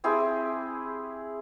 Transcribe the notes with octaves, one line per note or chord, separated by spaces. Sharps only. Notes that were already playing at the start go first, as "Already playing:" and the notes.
C4 E4 G4 G#4